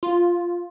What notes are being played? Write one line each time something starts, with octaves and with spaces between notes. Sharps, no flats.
F4